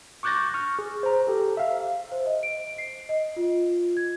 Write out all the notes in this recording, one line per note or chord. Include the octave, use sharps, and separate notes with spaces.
C#6 D6 F#6 G6 A6 A#6
C#6 F6
G#4
C5 A#5
G4 A4
E5 F5
C5
D#5
D7
C7
D#5
F4
G#6